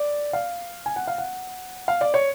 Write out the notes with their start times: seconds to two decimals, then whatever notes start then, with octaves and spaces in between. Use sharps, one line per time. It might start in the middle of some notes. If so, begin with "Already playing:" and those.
Already playing: D5
0.33 F5
0.86 G#5
0.96 F#5
1.08 F5
1.18 F#5
1.88 F5
2.01 D5
2.14 C#5